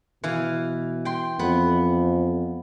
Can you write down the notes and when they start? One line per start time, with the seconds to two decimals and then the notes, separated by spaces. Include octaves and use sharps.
0.24 B2 E3 F5
1.05 G5 C6
1.39 F2 B3